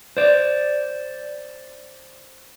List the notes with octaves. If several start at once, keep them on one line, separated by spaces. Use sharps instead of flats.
C5 D5